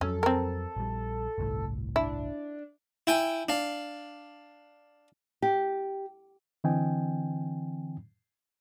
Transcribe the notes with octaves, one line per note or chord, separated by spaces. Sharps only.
F2 F#3 C#4 A4
C4 A#4
A#1 G3
G1 C2 A2
D4 E4
E4 G5 G#5
D4 F5
G4
D3 E3 C4 D#5 G5 G#5